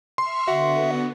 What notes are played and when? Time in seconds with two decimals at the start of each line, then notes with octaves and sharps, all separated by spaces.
0.18 E5 C6 C#6 F6
0.48 D3 B3 F#4 E5